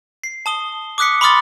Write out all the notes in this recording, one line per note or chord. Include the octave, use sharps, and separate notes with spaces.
C7
A5 D#6 G7
D6 D#6 F#6 B6 C#7
B5 C6 D6 D#6 F6 A6